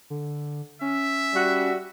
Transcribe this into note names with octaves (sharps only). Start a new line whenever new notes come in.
D3
C#4 E5
G3 F#4